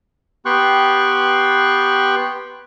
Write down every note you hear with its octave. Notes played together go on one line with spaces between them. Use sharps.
B3 G4 G5 C6 C#6 F#6